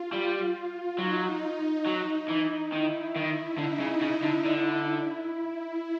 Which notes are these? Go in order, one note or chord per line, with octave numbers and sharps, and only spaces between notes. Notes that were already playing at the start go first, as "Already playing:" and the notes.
Already playing: F4
G3
F#3 D#4
F#3
E3
D#3 E4
D#3
D3 D#4
C#3
C#3 D#4
D3
D3 E4